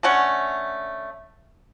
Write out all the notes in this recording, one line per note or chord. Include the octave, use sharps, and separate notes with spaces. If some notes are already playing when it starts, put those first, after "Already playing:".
D3 A3 C#4 F#5